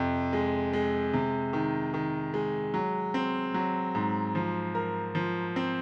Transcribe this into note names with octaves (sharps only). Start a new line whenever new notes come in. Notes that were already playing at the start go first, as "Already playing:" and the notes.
Already playing: F2 C3
G#3
G#3
C3
D#3
D#3
G#3
F#3
C4
F#3
G#2
F3
A#4
F3
C4